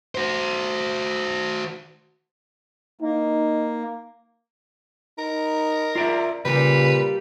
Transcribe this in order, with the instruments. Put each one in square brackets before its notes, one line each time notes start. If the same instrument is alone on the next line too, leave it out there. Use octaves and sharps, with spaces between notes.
[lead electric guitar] F#4 C5
[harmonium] A#3 [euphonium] D#4
[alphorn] D#4 [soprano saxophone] A#4
[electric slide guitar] F4 D5 E5
[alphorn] A#2 [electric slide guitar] C#3 [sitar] G3 [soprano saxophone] B4